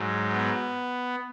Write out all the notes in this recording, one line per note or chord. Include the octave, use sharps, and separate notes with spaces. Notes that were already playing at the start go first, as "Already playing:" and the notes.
Already playing: G#2 F#3
B3